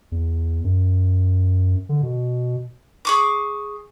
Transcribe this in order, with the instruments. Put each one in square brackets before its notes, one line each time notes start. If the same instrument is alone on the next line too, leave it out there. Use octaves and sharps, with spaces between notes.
[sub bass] E2
F#2
D3
B2
[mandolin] G#4 C#6 D6